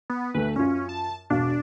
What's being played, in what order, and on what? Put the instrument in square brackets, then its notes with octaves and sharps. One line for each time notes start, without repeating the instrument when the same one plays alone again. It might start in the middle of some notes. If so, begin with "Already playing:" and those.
[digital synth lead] B3
[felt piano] D2 A3 [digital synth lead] B4
[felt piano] F#2 F4 [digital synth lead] C#4
[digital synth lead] A5
[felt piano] E1 F#4 F5 [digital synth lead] D4